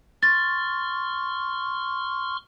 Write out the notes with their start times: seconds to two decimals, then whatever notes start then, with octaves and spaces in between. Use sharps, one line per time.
0.23 C6 C#6 F6 A6